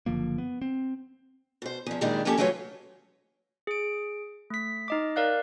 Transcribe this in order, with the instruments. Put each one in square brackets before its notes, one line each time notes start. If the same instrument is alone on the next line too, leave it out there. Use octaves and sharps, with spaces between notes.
[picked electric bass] F#1 D3 F3 A#3
B3
C4
[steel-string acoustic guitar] B2 C5
E2 F3
F#2 A#2 D#3 G3 G#3 D4
F3 A#3 B3 C#4 G4 A4
E3 F#3 A3 F4 B4 C#5
[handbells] G#4 D7
A3 B6
D#4 D#5 D6
A#4 D5 F5 F#6